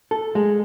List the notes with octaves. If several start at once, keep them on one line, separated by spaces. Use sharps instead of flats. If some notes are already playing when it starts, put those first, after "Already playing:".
A4
G#3